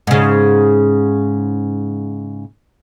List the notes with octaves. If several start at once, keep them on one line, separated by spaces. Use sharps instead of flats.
G#2 C#3